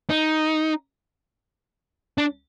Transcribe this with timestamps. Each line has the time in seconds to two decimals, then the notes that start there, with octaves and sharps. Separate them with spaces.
0.10 D#4
2.18 D4